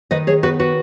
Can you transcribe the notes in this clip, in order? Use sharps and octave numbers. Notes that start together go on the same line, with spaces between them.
D#3 B4 D#5
G#4 C#5
B3 F#4 B4
F#4 B4